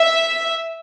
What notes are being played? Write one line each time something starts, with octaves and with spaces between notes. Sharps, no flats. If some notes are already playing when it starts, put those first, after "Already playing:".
Already playing: E5